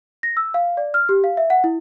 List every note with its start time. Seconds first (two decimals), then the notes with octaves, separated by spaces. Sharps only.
0.23 A#6
0.37 E6
0.54 F5
0.77 D5
0.94 F6
1.09 G4
1.24 F5
1.37 E5
1.50 F#5
1.64 E4